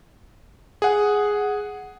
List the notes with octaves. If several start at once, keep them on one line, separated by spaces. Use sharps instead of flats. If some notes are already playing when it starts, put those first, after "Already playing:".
G#4 F#5